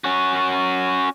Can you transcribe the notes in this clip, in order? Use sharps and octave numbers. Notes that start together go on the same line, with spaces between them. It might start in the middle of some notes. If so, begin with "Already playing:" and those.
C#4 F#4